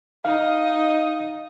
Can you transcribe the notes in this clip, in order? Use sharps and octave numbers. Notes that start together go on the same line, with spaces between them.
D#4 D#5 F5